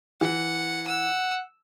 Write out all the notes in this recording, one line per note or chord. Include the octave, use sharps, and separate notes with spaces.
E3 F#5
F#5 E6